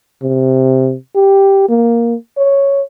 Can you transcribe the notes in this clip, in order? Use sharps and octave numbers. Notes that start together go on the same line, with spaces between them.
C3
G4
A#3
C#5